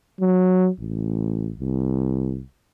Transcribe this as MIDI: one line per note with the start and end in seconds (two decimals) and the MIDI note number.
0.21 0.68 54
0.79 1.51 33
1.60 2.42 36